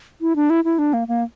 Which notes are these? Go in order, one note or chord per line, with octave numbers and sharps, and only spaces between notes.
E4
D4
E4
E4
D4
A#3
A#3